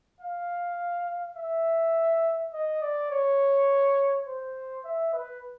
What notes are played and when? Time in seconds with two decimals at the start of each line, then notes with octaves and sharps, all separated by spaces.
0.21 F5
1.37 E5
2.53 D#5
2.82 D5
3.11 C#5
4.27 C5
4.84 E5
5.14 B4